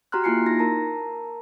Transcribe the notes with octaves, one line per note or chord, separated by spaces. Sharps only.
F#4 G4 A#5 C6 F6 F#6
A#3 E4 F4 G#5 C7 C#7
D#4 A#6
A#4 A5 A#5